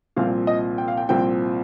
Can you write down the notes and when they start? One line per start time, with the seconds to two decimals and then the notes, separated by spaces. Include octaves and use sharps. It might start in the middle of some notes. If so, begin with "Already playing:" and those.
0.16 C2 A#2 F3 C4 F5
0.47 D#5
0.78 G5
0.88 F5
0.97 G5
1.09 C2 A#2 F3 C4 G5